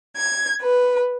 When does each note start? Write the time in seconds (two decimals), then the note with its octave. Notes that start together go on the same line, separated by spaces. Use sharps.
0.16 G#6
0.62 B4